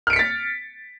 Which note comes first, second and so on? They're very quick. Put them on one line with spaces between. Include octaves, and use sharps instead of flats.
F6 D7 C#7 B6 A6